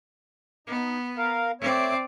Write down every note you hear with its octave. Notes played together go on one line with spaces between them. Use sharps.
B3 D#4
A#4 F5
A3 C4 C#5 D5 E5